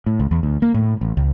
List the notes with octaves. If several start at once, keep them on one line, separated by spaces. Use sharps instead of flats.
A2
C#2
E2
D2
A#3
A2
A1
C#2